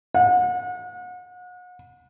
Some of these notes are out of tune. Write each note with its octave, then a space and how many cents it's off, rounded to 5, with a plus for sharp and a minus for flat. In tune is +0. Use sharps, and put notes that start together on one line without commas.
F#5 -40